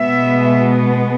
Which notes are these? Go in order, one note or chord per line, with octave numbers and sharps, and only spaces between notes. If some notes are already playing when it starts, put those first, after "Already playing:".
Already playing: B2 G#3 B3 E5